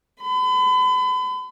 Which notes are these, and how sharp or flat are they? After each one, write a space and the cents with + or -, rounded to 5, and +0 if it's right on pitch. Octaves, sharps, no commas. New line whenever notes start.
B5 +40